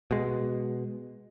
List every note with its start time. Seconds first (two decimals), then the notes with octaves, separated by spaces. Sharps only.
0.11 B2 G#3